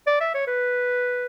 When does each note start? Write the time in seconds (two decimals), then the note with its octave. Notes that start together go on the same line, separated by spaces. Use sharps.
0.07 D5
0.20 E5
0.34 C#5
0.47 B4